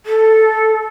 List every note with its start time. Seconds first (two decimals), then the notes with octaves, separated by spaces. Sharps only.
0.06 A4